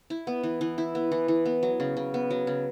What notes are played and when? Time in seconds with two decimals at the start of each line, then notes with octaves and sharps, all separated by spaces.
0.10 E4
0.27 B3
0.43 E3
0.61 E3
0.78 E4
0.95 B3
1.12 E3
1.28 E3
1.46 B3
1.63 F#3
1.80 C#3
1.97 C#3
2.14 B3
2.30 F#3
2.47 C#3